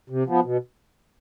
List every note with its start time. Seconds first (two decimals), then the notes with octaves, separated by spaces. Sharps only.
0.10 C3
0.27 F3 B3
0.44 B2